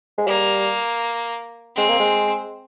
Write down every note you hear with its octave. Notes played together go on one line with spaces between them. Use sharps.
G#3
G3 A#3
G#3 C4
A#3
G#3